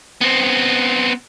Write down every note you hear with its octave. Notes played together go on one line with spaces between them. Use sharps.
B3 C4